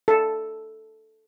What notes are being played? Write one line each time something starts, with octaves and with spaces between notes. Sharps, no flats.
A4